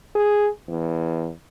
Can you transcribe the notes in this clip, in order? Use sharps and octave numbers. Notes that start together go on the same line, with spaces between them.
G#4
E2